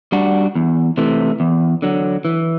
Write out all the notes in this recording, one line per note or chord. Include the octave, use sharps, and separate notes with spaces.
G3 D4 F#4
E2
C3 E3 A3
E2
D3 F#3
E3